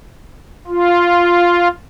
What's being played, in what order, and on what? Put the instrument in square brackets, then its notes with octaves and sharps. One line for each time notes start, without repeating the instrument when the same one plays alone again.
[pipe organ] F4